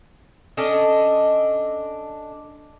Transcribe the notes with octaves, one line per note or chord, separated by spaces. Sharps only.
C#4 D4 A4 D#5